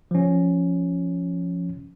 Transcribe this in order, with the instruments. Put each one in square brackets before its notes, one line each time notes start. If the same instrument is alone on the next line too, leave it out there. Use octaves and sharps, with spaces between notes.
[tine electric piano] F3 C#4